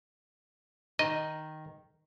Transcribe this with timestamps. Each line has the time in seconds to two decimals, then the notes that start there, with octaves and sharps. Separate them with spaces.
0.99 D#3 D#5